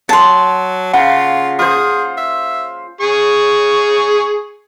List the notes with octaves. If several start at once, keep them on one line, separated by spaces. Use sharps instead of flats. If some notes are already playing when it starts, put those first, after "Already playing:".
F#3 A5 C6
C#3 F4 F#5
F4 G#4 C5
E5
G#4 C#6